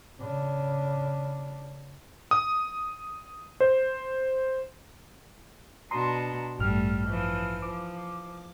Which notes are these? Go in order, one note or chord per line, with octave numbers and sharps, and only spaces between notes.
C#3 D4
D#6
C5
B2 D4 F#4 A#5 C6 D#6
A1 G2 G3 A3 F6
E3 F3
F3 D6